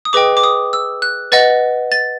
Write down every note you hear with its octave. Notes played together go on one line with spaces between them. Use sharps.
D#6
G#4 B4 D#5 G5 D6
D6
D#6
E6
F#6
B4 D#5 F#5 A6
A6